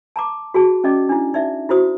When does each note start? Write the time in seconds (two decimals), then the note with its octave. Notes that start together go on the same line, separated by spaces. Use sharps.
0.16 A5 A#5 D6
0.54 F#4 G#4 A5
0.84 C#4 D5 D#5 D6
1.09 D4 E4
1.34 D#4 D5 E5
1.69 E4 F#4 C5 D#6